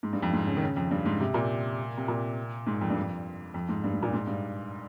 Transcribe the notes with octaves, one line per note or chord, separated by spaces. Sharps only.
G#2
G2
F2
G#2
C#3
D#3
C#3
F2
G2
G#2
C3
A#2
C3
A#2
G#2
F2
G2
F2
F2
G#2
G2
G#2
A#2
G#2
G2